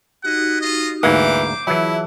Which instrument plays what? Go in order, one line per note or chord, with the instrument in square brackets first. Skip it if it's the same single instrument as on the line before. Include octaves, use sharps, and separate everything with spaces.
[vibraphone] D#4 F#4 G4 [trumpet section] E4 D#5 F#5
[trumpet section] F4 D#5
[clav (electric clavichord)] D2 G#2 A#3 [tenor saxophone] E3 [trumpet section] C5 D6
[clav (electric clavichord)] E3 F#3 [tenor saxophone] E4 [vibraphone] F4 G#4 A5